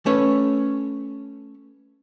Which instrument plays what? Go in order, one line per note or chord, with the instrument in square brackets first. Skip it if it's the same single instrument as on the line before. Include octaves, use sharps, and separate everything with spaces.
[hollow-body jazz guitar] A3 C#4 B4 C#5